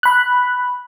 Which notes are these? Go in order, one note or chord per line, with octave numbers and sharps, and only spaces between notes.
B5 F#6